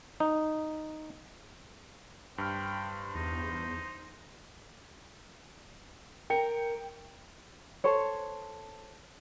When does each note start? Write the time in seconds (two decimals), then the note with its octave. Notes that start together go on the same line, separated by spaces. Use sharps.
0.20 D#4
2.38 G2 C5 G5 F6
3.15 E2 D#4
6.30 A#4 G5 C#7
7.84 A4 C5 C#5